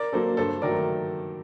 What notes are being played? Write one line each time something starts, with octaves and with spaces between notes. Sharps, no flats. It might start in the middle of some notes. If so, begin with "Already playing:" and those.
Already playing: A#4 D5
F#3 A#3 A4 C5
G2 A4 C5
D#3 F#3 A3 A#4 D5